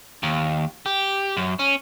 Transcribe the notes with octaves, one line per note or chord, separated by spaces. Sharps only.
D#2
G4
F#2
C#4